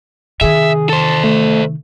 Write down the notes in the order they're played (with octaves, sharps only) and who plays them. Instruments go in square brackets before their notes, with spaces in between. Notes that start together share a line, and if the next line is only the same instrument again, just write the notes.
[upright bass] C3 D#3 [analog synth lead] G#4 [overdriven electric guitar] E5
[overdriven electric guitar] A4 C5 [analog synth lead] A5
[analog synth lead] A3